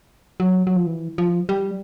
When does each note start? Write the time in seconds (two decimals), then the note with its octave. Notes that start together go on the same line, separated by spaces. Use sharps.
0.40 F#3
0.67 F#3
0.76 F3
0.86 E3
1.18 F3
1.49 G3